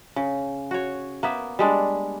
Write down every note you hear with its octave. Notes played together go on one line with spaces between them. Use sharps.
C#3
F#4 C#5
A#3 B3 E5
G3 G#3 D4